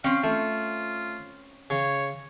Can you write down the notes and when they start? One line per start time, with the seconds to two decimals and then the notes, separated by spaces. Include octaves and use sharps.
0.04 C4 C#4 F5 G5
0.24 A3 F4
1.70 C#3 C#5